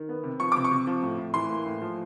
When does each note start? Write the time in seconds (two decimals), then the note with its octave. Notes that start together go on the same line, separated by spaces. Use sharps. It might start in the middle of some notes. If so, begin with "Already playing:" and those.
Already playing: D#3
0.09 B3
0.23 C3
0.40 F3 C#6
0.52 C3 D6
0.64 C#6
0.71 C3
0.87 F3
1.03 A2
1.18 A2
1.34 E3 C6
1.50 A#3
1.66 A2
1.82 F3